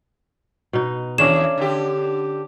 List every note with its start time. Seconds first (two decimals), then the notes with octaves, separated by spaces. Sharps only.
0.73 B2 D#4
1.18 D#2 C#4 D4 G#4 E7
1.58 D3 G4